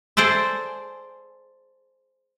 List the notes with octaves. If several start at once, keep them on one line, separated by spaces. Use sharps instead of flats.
G#4 A4 C5 D5 E5